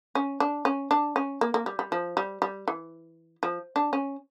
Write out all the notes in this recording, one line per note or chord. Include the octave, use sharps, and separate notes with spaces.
C#4
D4
C#4
D4
C#4
A#3
A#3
G3
G3
F3
G3
G3
E3
F3
D4
C#4